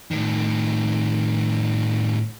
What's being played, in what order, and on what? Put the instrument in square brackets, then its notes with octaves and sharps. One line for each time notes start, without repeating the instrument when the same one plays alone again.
[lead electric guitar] A2 D#3